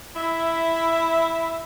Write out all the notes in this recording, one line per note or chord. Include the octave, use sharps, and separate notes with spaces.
E4 E5